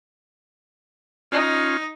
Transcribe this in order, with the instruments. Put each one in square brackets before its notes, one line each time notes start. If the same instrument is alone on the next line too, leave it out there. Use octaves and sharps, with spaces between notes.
[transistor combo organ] C#4 F4 [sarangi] D#4